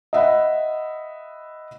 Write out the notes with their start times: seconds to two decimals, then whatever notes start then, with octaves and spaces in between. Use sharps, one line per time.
0.13 D#5 E5 F#5 B5